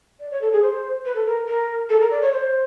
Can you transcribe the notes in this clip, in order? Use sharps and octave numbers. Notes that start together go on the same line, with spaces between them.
D5
C#5
A4
G#4
C5
B4
A4
A#4
A#4
A4
A#4
D5
C#5
C5